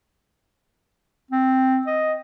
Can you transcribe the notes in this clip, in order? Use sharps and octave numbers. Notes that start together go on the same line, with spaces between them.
C4
D#5